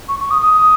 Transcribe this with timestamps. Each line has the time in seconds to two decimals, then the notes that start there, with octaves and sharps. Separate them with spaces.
0.08 C#6
0.20 C#6
0.31 D#6
0.42 D#6